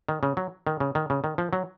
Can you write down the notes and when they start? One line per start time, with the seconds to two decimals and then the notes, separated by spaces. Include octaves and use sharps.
0.09 D#3
0.23 C#3
0.37 F#3
0.67 D#3
0.80 C#3
0.95 D#3
1.10 C#3
1.24 D#3
1.38 F3
1.53 F#3